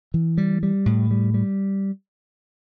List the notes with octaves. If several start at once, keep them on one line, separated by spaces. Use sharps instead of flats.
E3
G3
G3
A2
G3
G3